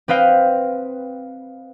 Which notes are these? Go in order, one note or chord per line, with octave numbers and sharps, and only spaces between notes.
C4 B4 D#5 F5 G5